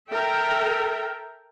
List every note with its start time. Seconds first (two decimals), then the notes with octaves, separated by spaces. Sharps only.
0.11 A4 A#4 E5 G5